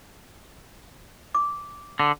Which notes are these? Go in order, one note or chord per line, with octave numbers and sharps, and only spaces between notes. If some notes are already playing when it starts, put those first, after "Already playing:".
D6
D3